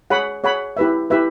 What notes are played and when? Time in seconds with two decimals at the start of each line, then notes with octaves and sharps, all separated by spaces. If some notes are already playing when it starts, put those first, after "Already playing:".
0.10 G#4 C#5 F#5 B5
0.44 G#4 C#5 F#5 B5
0.77 E4 G4 B4 E5
1.10 E4 G4 B4 E5